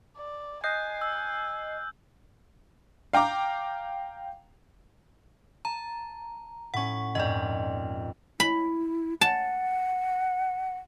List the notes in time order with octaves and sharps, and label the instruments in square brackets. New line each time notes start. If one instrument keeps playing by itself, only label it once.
[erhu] D5
[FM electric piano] D#5 C7 [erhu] G#5 [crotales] F#6 G6
[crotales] E6
[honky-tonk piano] F5 G5 A#5 D6
[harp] A5 [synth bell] A#5
[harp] A2 C#4 [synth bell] F#5 C#6
[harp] A#1 F2 G#2 [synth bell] D5 D#5
[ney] E4 [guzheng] B5
[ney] F#5 [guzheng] A5